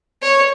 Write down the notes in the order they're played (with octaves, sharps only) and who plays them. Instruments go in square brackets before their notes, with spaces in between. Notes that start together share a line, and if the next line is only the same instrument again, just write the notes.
[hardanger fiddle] C#5